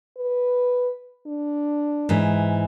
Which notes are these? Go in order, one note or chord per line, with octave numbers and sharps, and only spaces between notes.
B4
D4
G#2 E3